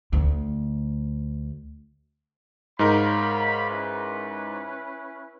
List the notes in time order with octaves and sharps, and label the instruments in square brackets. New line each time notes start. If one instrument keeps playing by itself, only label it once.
[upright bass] D2 A3
[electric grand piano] G#2 D#4 A#4 [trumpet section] C#5 F5 B5
[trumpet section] C#4 E4 B4